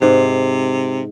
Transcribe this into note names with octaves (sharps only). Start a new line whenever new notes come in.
G#2 C3